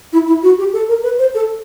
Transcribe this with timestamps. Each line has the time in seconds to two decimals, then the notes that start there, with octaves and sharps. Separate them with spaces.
0.13 E4
0.27 E4
0.43 F#4
0.58 G4
0.73 A4
0.89 A#4
1.03 B4
1.19 C5
1.34 A4